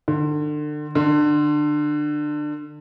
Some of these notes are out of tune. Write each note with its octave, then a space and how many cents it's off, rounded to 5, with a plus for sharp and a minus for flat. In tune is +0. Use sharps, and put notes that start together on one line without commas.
D3 +35
D3 +25